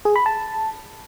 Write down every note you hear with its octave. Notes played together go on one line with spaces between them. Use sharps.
G#4
B5
A5